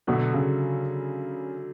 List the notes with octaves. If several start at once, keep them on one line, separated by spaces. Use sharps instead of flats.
B2 D3 F#3 A3
C#3